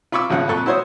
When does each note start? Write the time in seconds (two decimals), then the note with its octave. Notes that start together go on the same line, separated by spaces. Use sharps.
0.12 F4 B5 C#6 D6 E6
0.30 G#1 C#3 F3 F#5
0.48 F2 A#2 A4 C#6 F#6
0.66 E4 F#4 C5 C#5 D#6